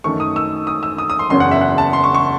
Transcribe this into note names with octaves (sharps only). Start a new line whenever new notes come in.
F#2 D#3 A3 C#6
D#6
E6
D#6
E6
D#6
D#6
C6
F#1 E2 C#3 F#3 C#4 C6
F#5
E5
F#5
A5
C6
C#6
C#6